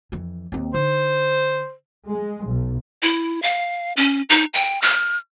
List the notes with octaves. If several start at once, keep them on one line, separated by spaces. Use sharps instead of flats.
F2 E3
D#2 C4
D3 D#4 C5
G#3
B1
E4
F5
C#4
D#4
G5
F6